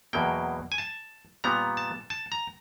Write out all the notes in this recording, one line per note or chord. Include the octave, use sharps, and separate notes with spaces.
E2 B2 F#3 A#3 G5
G#5
A5
A#2 G3 B3 A#5
A5
A5
A#5